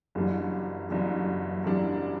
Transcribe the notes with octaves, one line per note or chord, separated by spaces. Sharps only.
F#1 F#2 E3 G3 D4
F#1 F#2 E3 G3 D4
F#1 F#2 E3 G3 D4